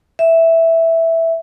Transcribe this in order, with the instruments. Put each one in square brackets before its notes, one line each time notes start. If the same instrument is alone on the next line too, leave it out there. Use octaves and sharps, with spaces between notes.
[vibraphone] E5